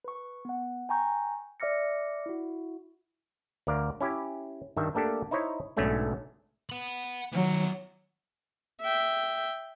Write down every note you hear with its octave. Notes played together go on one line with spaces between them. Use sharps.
B4 C#6
B3 F#5
G5 G#5 A#5 C#6 G6
D5 E5 D6 F6 A#6 C#7
E4 F#4
D2 A#4 D5 F5
C#4 E4 G4
G2 D#3 G3 E5
A3 A#3 D4 G4 A4
D#4 E4 C5 C#5 D#5
B1 G#2 F#3 A3 C#4 D4
F#5 B5
D#3 F#3 B3
E5 G5